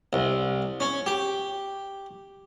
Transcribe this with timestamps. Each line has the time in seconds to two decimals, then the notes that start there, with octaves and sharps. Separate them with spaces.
0.13 C2
0.80 C#4
1.06 G4